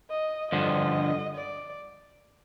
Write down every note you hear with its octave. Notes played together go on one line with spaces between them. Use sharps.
D#5
G2 D3 F3 D#5
D5